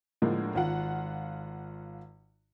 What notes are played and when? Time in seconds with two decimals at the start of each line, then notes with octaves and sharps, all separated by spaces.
0.22 A2 D3 F3 G#3 A#3
0.55 G#1 F4 F#5